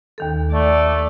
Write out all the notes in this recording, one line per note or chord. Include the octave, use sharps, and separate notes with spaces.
D#2 D#3 A4
A3 D5